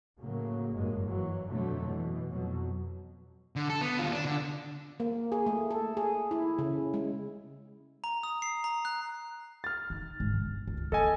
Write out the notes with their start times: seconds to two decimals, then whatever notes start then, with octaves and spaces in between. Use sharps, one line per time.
0.18 A2 C#3 F#3 A#3
0.74 F#1 G2 F#3 G#3 A#3
1.04 E3 F#3
1.49 F2 B2 D3 F#3 A3
1.82 B2 E3
2.29 F2 B2 F#3
3.56 D3
3.69 A4
3.81 B3
3.99 D#2 F4
4.12 D4
4.25 D3
5.00 A#3
5.32 G#4
5.46 A3
5.71 A4
5.97 G#4
6.31 E4
6.59 C#3
6.94 G#3
8.04 A#5
8.23 D#6
8.42 C7
8.64 A#5
8.85 F#6
9.64 F6 A6
9.90 D#3
10.20 G#2
10.35 G1
10.68 C#2
10.92 D#2 A4 D#5 G#5